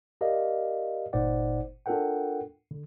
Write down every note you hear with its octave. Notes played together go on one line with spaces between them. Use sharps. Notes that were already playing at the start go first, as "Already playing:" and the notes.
G4 A#4 D5 D#5 F5
G1 A#2 D#4 C5 D5 F#5
D4 F4 A4 A#4 F#5 G5
D3